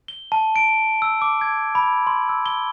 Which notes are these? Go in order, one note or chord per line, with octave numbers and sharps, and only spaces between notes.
G7
A5
D7
E6
D6
G#6
B5
C6
E6
G7